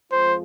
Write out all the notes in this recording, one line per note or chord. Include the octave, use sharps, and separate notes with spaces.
F2 F3 G#3 F4 C5